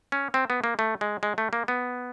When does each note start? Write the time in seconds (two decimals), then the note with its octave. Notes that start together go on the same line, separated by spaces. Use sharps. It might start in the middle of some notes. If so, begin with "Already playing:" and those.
0.12 C#4
0.34 C4
0.50 B3
0.64 A#3
0.79 A3
1.01 G#3
1.23 G#3
1.38 A3
1.53 A#3
1.68 B3